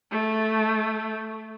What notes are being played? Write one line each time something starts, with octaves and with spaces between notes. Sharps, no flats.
A3